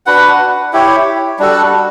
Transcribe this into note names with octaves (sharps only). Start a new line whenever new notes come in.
D4 F#4 B4 F#5
E4 G4 C#5
G3 D4 F#4 A4